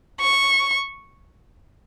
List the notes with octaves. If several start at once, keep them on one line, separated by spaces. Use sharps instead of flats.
C#6